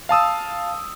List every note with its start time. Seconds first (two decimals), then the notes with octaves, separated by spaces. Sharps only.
0.09 F5 A5 D#6 E6